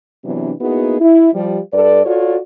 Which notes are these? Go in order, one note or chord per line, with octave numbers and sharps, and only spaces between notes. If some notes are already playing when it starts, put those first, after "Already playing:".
C3 E3 F#3 B3 D4
A#3 B3 D#4 E4 F#4 G#4
E4
F3 G3
G2 A4 B4 D5
F4 F#4 A4 C#5 D5